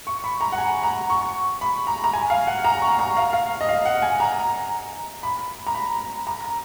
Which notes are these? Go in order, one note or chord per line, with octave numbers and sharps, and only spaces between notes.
C#6
B5
A#5
F#5
G#5
A#5
C#6
B5
A#5
A#5
G#5
F5
F#5
A#5
C#6
A#5
F5
F5
D#5
F5
F#5
G#5
A#5
B5
A#5
B5
A#5